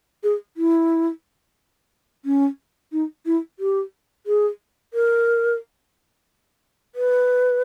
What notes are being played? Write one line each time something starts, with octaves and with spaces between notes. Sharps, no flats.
G#4
E4
C#4
D#4
E4
G4
G#4
A#4
B4